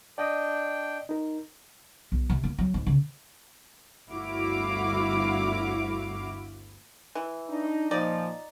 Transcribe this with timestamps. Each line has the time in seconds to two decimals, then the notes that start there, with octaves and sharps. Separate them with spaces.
0.18 D4 D5 D#5 G5 D#6
1.09 D#4 A#4
2.12 B1
2.30 C3
2.44 A#3
2.59 F#3
2.74 G#2
2.86 C#3
4.08 G1 D2 E4 F#4 F5 D6
7.15 E3
7.49 D4 D#4
7.91 A#2 F3 D#4 D5